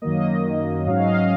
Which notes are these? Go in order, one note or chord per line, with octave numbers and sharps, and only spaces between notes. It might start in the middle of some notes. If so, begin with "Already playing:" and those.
F#2 D#3 F#3 A#3 D#5
G#2 F#3 C#4 F5
D#5
F5